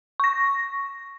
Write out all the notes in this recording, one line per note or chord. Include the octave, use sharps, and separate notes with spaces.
C#6 A#6